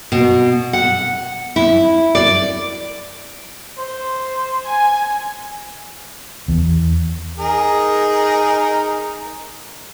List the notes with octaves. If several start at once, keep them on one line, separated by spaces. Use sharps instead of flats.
B2
F#5
E4
D5
C5
G#5
E2
D#4 G#4 A#4